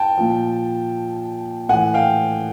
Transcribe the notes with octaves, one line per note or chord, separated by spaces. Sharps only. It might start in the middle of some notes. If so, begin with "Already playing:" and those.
Already playing: G5 A5
A#2 F3
A2 E3 F#5 G#5
F5 G5